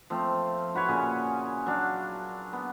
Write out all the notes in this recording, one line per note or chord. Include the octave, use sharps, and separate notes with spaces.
F3 A3 C4
E4 F#4 B4 C#5
A#2 C#3 C#4 G#4
F#3 D4 F5
B3